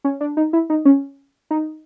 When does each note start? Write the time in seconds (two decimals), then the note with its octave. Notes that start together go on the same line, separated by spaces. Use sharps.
0.04 C#4
0.21 D4
0.37 D#4
0.53 E4
0.70 D#4
0.85 C#4
1.51 D#4